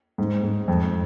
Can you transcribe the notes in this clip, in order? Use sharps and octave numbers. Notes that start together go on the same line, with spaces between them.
G#2
G#2
F2